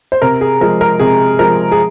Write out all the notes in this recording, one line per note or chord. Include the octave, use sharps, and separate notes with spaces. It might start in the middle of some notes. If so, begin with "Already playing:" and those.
C5
C3 A#4
G#4
F3 G#3 A#4
A#4
C3 G#4
F3 G#3 A#4
G#4